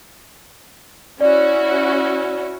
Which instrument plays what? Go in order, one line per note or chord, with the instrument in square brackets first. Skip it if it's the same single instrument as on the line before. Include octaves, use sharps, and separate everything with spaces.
[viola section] C#4 E4 F#4 [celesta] D5